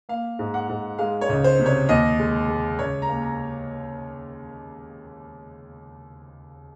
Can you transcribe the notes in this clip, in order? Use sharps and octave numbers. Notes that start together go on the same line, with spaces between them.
A#3 F5
G#2
F#5
G#2
G#3 F5
C#5
C#2
C5
C3
C#5
D#2 D#5
G#3
G#3
C#2 C#5
A#5
A#3
A#5